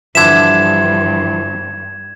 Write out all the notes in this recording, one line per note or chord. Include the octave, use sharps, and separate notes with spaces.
G2 D3 E3 F3 E5 G#6 E7